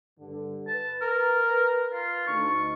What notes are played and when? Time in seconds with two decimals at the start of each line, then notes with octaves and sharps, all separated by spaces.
0.19 G2 D3
0.68 B4 A5
1.02 A#4
1.93 F4
2.27 D2 D4 D#4 C#6